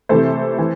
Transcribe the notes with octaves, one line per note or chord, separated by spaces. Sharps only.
C3 E3 A3 A4 C5
E3